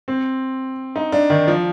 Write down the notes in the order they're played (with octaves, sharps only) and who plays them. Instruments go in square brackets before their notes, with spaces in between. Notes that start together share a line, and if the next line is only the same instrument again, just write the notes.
[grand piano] C4
D#4
D4
D#3
F3